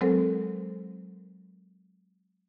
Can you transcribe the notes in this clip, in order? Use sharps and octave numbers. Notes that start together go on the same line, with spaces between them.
F#3 G#3 C4 A4 A#4 C5